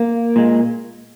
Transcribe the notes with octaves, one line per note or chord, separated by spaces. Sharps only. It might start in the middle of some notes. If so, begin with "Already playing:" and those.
Already playing: A#3
A#2 G#3